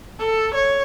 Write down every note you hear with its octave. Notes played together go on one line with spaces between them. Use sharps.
A4
C#5